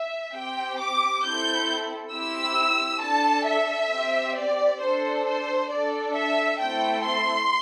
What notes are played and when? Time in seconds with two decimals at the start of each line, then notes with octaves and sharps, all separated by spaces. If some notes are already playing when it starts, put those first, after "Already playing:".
Already playing: E5
0.34 C4 G4 G5
0.79 D6
1.24 C4 E4 A4 G6
2.13 C4 E4 G4 E6
3.02 D4 A4 A5
3.47 E5
3.92 C4 G4
4.36 D5
4.81 D4 A4 C5
5.26 C5
5.70 D4 A4 D5
6.15 E5
6.59 A3 C4 E4 A4 G5
7.05 C6